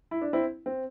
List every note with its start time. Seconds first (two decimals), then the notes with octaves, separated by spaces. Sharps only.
0.11 E4
0.22 D4
0.33 C4 E4
0.66 C4